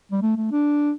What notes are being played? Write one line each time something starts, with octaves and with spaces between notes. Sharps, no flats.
G3
A3
A3
D4